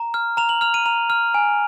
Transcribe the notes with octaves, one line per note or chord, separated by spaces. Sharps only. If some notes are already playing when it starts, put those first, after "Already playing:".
Already playing: A#5
F6
A#5 F7
F#7
F6 F7
D#7
A#5 F7
F6
G#5